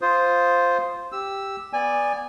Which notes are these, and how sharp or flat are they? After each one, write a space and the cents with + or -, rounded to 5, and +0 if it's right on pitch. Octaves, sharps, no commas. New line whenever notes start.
F4 +0 C5 +0 D#6 +0
G4 +0 E6 +0
B3 +0 D5 +0 G#5 -15